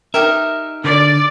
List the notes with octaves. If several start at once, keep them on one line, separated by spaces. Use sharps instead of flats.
D#4 G4 A#4 E5
D3 D5